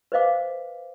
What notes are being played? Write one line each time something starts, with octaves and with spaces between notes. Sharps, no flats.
B4 C5 D#5 F5 D6